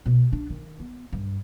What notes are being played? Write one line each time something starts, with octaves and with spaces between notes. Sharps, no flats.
B2
D4
D#3
B3
G2